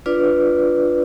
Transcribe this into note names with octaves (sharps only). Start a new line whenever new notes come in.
D4 F4 B4 D5